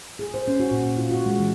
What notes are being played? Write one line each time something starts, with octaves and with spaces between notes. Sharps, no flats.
G#4
C5
C#4
F#4
A#2
F4
F#4
G#3
E3